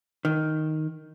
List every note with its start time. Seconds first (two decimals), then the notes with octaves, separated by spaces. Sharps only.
0.25 D#3